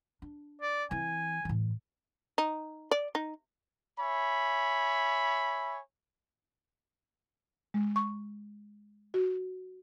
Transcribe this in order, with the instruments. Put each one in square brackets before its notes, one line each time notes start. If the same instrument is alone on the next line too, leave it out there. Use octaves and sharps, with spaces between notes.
[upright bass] D4
[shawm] D5
[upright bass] E3 C4 [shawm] G#5
[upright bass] A2 E3
[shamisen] D#4
D5
D#4
[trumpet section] C#5 E5 G#5 B5
[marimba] G#3
C#6
F#4